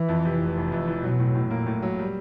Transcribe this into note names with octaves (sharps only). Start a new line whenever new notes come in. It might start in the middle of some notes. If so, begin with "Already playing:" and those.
Already playing: E3
F2
C3
F1
F1
F2
E3
B2 F#3
A2
A2
A#2 A#3
A2
F#3
G3